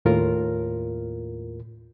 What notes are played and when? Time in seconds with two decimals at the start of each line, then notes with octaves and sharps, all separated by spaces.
0.05 D#2 A2 F4 A#4